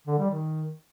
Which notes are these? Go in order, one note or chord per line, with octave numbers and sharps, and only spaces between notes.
D3
G3
D#3